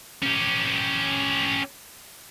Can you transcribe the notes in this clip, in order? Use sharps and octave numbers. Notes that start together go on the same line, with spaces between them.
C#4 G4